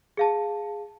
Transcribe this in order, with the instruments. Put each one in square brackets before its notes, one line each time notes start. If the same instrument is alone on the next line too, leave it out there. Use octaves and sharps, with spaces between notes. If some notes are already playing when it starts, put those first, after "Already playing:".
[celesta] G#4 F5 A5